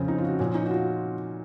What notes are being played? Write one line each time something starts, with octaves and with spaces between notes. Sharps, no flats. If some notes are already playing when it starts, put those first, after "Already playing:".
Already playing: F2 C#3 F3 C4 C#4
D#4
F4
F#4
A#2 F3 C#4
D#4
F#4
F4